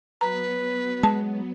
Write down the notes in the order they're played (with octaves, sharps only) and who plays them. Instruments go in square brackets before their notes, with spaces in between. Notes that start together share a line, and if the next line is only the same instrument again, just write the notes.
[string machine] F#3 B3 [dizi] B4 [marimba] A#5
[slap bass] G#3 [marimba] A5